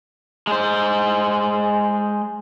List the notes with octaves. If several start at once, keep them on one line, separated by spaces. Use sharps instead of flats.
G#3 C5